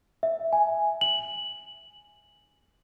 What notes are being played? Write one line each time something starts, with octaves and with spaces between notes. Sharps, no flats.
E5
G#5
F#7